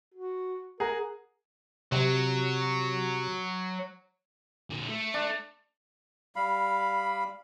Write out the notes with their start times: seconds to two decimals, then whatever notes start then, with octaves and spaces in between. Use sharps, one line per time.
0.14 F#4
0.80 G#4 A#4 F#5 A#5
1.92 C3 F#3
4.70 A#2 D3
4.89 A3
5.14 D4
6.36 G3 F5 B5